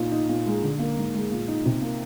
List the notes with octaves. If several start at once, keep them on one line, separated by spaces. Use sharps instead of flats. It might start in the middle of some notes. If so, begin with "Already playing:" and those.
Already playing: A#2 D#4
D#4
A#2
G#3
D3
A#3
G#2
G#3
A#2
D#4
C3
A#3